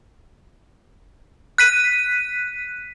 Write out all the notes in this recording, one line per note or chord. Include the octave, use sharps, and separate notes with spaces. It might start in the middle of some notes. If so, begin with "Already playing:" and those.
F#6 B6 D#7